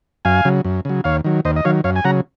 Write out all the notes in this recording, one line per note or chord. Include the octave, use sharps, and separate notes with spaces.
F#2 F5 G#5
C#3 F#3
F#2
C#3 F#3
D#2 C#5 F5
D#3 F#3
D#2 C5 D#5
D#5
D#3 F#3 C#5 F5
F#2 C#5 F5
G#5
C#3 F#3 F#5 A#5